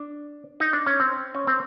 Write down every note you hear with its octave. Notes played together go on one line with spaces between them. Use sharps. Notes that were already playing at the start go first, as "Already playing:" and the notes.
Already playing: D4
D#4
D4
C#4
C4
C#4
C4